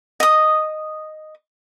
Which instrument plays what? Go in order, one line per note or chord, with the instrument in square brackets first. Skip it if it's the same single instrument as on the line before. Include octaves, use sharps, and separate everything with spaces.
[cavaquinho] D#5 D#6